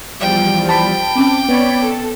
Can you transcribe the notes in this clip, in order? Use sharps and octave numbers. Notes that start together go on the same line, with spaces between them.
E2 F3 G3 G5
C5 G5 A5 B5
C4 C#4 D6
B3 C#5 D5 B5
A4